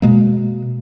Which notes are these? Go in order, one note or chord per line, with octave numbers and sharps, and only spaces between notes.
B2 G#3 A#3